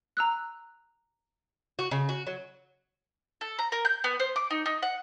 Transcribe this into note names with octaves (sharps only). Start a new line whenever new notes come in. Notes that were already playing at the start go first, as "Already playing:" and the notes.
A#5 E6 F#6
F#4
C#3
F#4
F#3
A4
A#5
A#4
G6
B3
C5
D6
D#4
D#4
F#5